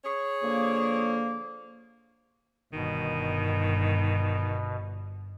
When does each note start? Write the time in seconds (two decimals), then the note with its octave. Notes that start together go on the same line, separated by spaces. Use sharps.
0.05 G#4 C#5
0.42 D3 F3 A#3
2.73 G1 G2 B2 D#3